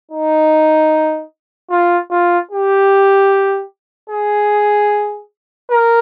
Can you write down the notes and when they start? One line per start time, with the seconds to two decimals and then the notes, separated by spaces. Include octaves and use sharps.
0.11 D#4
1.70 F4
2.10 F4
2.51 G4
4.10 G#4
5.70 A#4